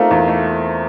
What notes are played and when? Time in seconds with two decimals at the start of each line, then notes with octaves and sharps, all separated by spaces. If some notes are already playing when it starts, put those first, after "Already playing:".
Already playing: A3 A#3 C4 D#4 F4
0.11 E2
0.28 A3